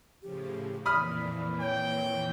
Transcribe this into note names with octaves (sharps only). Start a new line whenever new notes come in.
A2 C#3 F3 G4
F2 A#2 E3 D5 B5 D#6 F6
C#5 G5